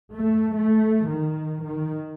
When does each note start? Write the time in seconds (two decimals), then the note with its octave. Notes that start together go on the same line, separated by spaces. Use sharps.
0.13 A3
0.52 A3
1.08 D#3
1.62 D#3